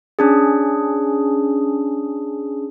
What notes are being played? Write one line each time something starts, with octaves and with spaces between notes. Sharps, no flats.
C#4 D4 G#4